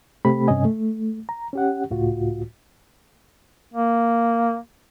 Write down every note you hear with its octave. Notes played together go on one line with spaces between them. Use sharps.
C3 A3 C4 G4 B5
G2 C3 C#4 D#5 G#5
A3
A#5
C#4 G4 F#5
C#2 A2 F4 F#4
A#3